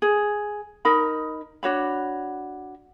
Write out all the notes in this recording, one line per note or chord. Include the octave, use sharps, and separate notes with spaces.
G#4
D#4 A#4 B5
D4 F#4 C#5 B5